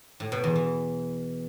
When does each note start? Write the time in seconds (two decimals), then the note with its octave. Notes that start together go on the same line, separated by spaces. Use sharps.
0.20 A2
0.32 B2
0.44 E2
0.55 E3